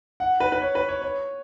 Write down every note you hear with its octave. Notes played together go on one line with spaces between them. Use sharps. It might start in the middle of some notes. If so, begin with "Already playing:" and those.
F#5
B4
B4
C#5
B4
C#5
C#5